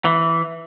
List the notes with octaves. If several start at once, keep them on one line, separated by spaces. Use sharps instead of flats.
E3